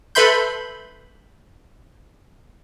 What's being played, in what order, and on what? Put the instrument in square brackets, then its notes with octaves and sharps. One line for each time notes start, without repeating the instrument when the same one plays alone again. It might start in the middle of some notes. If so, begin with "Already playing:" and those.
[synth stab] A4 B4 E5 B5 C6 G6